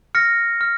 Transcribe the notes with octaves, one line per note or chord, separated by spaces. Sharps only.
F6 A#6 C#7
F6